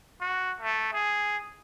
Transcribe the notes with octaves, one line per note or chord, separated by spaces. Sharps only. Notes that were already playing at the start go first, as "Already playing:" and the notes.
F#4
A3
G#4